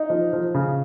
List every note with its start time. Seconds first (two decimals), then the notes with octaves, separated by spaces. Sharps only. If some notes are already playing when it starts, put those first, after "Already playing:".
Already playing: D#4
0.10 F3
0.33 F3
0.54 C#3